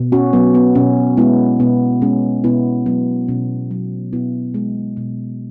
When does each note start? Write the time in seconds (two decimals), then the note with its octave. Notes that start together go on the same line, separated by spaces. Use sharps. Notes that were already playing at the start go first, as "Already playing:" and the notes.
Already playing: B2
0.12 C#4 F#4
0.33 F#3 B3
0.55 B3
0.75 B2 C#4
1.17 G#3 B3 E4
1.60 B2 B3
2.02 G#3 C#4
2.44 B2 B3 E4
2.86 F#3 B3
3.28 B2 C#4
3.71 F#3
4.13 B2 B3 E4
4.54 G#3
4.97 B2